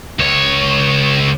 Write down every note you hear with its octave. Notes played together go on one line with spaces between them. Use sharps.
C#2 C#5